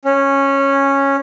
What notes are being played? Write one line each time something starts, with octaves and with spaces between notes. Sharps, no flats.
C#4